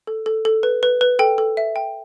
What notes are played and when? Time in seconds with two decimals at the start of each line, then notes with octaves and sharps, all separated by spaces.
0.07 A4
0.26 A4
0.45 A4
0.63 B4
0.83 B4
1.01 B4
1.19 A4 G5
1.38 A4
1.57 E5
1.76 G5